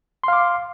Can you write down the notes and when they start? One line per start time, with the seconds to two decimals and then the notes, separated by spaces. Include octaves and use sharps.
0.24 C6
0.28 F5
0.33 D6